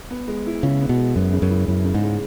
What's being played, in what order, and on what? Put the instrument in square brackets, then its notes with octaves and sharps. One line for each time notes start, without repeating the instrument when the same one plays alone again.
[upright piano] B3
G#3
E4
[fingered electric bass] C#3 [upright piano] E4
[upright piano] B3
[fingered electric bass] B2
[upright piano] G#3
[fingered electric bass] F#2 [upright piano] B3
[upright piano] C#3
[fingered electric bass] F#2
[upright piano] E4
[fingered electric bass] F#2 [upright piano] E4
[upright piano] C#3
[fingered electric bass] G#2
[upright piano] G#3